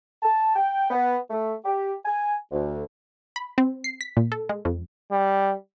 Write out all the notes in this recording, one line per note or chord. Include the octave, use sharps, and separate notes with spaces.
A5
G5
B3
A3
G4
G#5
D2
B5
C4
C7
B6
A#2
A4
G#3
F2
G3